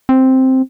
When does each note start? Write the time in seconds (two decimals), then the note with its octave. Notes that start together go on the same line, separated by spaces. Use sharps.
0.09 C4